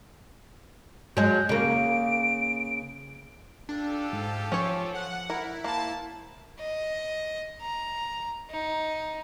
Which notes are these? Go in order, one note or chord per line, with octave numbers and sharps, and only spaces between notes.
F#3 G#3 G6
C#3 A#3 D7
D4 F4 G4 A4
G#2
F3 C#4 C#5
F#5
E4 A#4
A#3 C5 A5
D#5
A#5
D#4